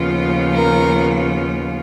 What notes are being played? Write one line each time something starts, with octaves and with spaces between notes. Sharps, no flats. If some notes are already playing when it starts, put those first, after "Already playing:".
Already playing: D#2 C#3 F3 B3 F4
A#4